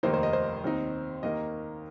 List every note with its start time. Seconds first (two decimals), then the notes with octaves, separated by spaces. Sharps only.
0.03 F1 D#2 D#3 A#3 D#4 C5
0.14 C5
0.23 D#5
0.33 C5
0.64 D#2 D#3 C4 D#4
1.23 D#2 D#3 A#3 D#5